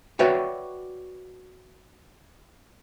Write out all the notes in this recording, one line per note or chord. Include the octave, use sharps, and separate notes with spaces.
F#4 B4 C#5 D5 E5 G5